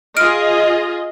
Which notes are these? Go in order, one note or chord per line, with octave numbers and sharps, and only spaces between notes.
F4 G#4 D#5 F6 D7